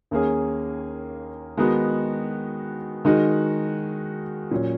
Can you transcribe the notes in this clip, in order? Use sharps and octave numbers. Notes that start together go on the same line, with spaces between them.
D#2 D#3 A#3 C#4 G#4
D#3 G#3 B3 D#4 F#4
D#3 G#3 D#4 F#4
A#2 F#3 C#4